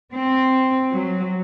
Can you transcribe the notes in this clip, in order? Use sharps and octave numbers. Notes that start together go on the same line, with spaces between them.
C4
F#3